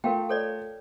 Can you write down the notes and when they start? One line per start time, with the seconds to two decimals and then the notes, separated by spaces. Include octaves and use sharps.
0.04 A3 F4 A#4 F5 G5
0.29 A4 C#5 D5